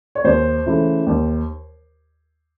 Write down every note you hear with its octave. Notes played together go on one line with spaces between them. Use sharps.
C#5
D#2 C5
C#3 E3 A3
D#2